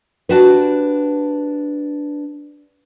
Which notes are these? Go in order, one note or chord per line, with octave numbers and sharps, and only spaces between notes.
D4 F#4 G4 B4